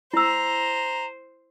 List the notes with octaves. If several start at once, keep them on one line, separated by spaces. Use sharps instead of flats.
E4 C5 A#5 E6